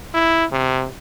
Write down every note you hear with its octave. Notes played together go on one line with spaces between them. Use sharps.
E4
C3